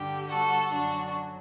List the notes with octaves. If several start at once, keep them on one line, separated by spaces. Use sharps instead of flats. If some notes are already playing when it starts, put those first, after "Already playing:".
Already playing: G2 D3 G3 G4
F#4 A4
F#2 D3 F#3 D4 F#4